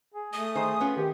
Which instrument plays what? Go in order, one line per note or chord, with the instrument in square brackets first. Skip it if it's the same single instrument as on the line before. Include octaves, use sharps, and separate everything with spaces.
[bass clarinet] G#4
[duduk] A3 [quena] D#6
[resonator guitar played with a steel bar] D#3 D#4 C5 [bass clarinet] G#4
[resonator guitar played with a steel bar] B3 C#4 F4
[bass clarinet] D#3 [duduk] G4